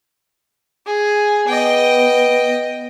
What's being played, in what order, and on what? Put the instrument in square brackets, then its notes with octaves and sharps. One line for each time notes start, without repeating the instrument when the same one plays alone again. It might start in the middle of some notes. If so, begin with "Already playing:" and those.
[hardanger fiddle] G#4
[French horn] B3 [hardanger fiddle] D#5 G5